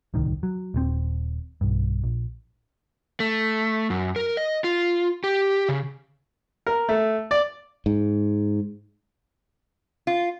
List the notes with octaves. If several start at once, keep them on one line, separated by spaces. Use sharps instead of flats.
D1 C2 D#3
F#3
D#1 B2 C4
B1 G2
A#1
A3
F#2
A#4
D#5
F4
G4
C#3
A#4
A3
D5
G#2
F4